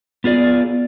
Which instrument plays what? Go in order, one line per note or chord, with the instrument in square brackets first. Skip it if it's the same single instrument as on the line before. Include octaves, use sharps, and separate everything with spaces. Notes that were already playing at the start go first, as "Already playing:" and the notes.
[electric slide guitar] B3 F4 G#4 D5